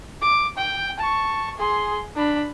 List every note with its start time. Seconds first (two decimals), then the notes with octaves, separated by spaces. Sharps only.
0.21 D6
0.58 G5
0.99 A5 C#6
1.57 G#4 C6
2.16 D4 B5